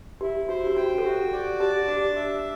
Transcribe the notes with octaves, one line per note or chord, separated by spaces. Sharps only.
E4 G4
F#4 C5
G4
F#4 G5
A4
F#4 G4
D5
G4 A5
D4 G4
E5